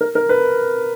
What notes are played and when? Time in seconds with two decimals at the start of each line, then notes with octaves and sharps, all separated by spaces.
0.01 A#4
0.15 A#4
0.29 B4